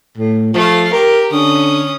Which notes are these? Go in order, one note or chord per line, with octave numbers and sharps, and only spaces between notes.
A2
F3 A3 F5
G4 A#4
D3 C#4 D#6